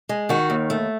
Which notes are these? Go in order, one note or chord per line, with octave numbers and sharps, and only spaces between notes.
G#3
D#3 F#4
D#2
A3